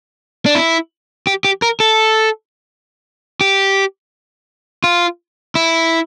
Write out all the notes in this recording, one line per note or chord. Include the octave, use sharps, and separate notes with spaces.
D4
E4
G4
G4
A#4
A4
G4
F4
E4